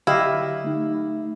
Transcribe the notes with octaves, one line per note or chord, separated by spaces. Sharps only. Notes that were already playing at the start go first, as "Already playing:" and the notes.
D3 F#3 E4 G4 D#5 F5
A3 D#4